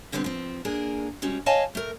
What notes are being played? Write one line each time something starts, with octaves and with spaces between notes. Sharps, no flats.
B2 D3 G3 B3 C4
F3 C4
A#3 D4 G#4 A#4
G3 G#3 C#4 F#4
C#5 D#5 F5 G#5 A5
A3 A#4